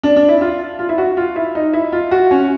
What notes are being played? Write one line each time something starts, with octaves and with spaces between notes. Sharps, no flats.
D4
D4
E4
F4
F4
E4
F#4
F4
E4
D#4
E4
F4
F#4
C#4